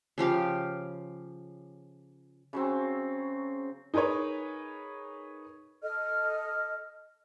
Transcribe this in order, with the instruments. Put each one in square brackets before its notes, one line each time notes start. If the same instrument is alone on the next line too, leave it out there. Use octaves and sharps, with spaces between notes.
[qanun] C#3 F3 G4 F5
[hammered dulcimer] C#3 F#3 C4
[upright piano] D#4 G#4 A#4 B4 C#5
[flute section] A4 D#5 F6